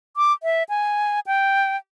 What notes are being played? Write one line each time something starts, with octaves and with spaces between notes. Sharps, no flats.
D6
E5
G#5
G5